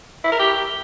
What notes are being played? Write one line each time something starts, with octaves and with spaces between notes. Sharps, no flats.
E4
A#4
G4